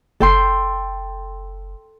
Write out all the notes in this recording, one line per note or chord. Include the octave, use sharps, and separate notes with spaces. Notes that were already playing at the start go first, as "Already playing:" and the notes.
F#1 A4 G5 C6